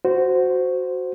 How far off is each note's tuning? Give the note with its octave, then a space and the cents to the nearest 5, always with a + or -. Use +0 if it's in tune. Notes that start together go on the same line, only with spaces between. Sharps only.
F#4 +0 C5 -10